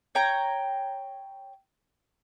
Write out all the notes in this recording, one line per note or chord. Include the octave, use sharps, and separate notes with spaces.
C#5 G5 A#5